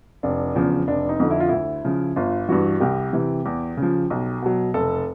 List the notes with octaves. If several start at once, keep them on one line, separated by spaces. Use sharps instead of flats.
F1 D4
E2 C#3 F3
F1 D4
D#4
F2 D3
E4
F4
D2 E4
C#3 F3
G1 F4
G2 E3 F#4
C2 G4
C3 E3
E2
C#3
F3
B1
B2 F#3
F1 A4